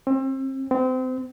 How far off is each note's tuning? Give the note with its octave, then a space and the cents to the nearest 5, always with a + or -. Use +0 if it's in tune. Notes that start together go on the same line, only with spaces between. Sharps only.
C4 +35
C4 -30